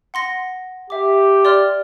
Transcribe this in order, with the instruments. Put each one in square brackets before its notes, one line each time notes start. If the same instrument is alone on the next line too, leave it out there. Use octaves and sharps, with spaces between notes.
[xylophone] F#5 C6 A#6
[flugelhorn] G4 [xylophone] E5 D6
[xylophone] D5 C6 F6